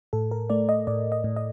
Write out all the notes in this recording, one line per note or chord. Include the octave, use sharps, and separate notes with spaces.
A2 A4
A#4
A3 D5
D#5
A2 D5
D#5
A2
D#5